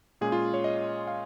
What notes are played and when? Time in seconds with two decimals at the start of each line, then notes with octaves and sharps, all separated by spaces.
0.21 A#2 G#3 C#4 G#4
0.32 F4
0.54 C#5
0.64 D#5
1.07 F5